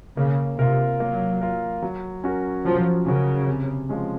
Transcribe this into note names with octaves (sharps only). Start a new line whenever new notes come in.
C#3 A#3
C3 F4 A#4
F#3 A#3
F4 A#4
F#3
C#4 F#4 A#4
F3 F#3
C#3 C#4 F#4 A#4
C3
F3 G#3 C#4